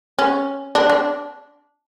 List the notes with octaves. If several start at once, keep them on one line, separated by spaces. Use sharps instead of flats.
C#4
D4
D4